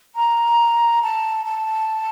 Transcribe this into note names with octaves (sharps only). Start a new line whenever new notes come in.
A#5
A5
A5